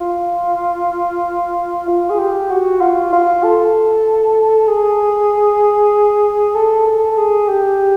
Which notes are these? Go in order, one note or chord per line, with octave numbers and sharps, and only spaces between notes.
F4
F4
G#4
G4
F#4
F4
F4
A4
G#4
A4
A4
G#4
G4